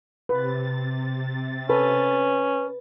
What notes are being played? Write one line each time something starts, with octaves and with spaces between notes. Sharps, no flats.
C3 B4 A6
C#4 A4 B4